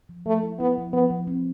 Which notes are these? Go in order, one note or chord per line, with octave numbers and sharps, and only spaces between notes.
F3
F3 A3
E4
B3 E4
F3
F3 B3
F3
C4